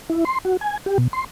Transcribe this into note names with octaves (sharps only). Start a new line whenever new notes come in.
E4
C6
F#4
G#5
G4
B2
C6